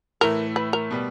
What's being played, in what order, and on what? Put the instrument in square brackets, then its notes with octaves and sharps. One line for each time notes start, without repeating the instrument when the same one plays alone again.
[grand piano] A2 E3 A3 [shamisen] A#4
[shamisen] B4
A#4
[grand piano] B2 G3 B3